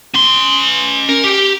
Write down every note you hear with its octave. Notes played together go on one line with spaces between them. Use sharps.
C#4 C6
A#4
G4